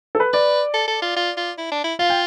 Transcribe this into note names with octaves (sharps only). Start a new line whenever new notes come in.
A4
B4
B4 D5
A4
A4
F4
F4
F4
E4
D4
E4
F4 F5
G5